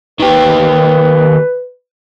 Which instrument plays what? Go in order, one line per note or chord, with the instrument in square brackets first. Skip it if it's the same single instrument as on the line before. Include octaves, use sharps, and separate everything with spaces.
[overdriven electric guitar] D#3 G4 [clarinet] B4